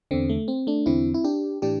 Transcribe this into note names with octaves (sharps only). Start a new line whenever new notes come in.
E2 D3 C4
A3
C4
A3 D4
E2 D3 C4 E4
E4
D4 G4
A2 E3 D4 G4